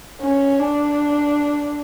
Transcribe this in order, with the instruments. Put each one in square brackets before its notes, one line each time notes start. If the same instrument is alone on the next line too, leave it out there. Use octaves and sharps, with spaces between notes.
[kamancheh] C#4
D4